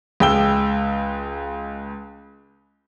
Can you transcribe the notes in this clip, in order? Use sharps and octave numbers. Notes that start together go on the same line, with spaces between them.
C#2 G#3 G5 E6 G7